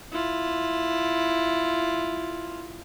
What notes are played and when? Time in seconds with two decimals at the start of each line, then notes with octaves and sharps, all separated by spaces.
0.12 E4 F4